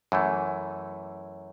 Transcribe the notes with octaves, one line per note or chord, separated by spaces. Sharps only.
F#2 E3 A3